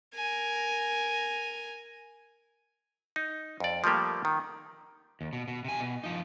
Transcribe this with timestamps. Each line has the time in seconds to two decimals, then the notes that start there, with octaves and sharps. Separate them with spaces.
0.14 A#4 G#5
3.16 D#4
3.60 F2 D5
3.84 F3 G3 A3 A#3 G4
4.25 D#3
5.21 D#2
5.33 B2
5.48 B2
5.65 C3 G#5
5.80 B2
6.04 F3 D#4